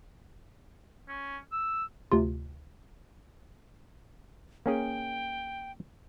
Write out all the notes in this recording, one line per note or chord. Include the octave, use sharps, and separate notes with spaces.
C#4
E6
D2 C3 F4
A#3 C#4 G#4 G5